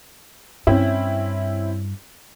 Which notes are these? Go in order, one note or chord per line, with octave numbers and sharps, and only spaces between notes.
G2 C4 C#4 E4